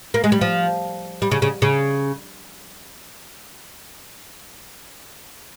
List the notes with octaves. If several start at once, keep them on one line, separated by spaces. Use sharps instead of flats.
A#3
G#3
G3
F3
G3
C#3
C#3
C#3